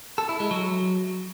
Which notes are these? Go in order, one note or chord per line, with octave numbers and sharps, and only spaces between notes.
A4
E4
G#3
F#3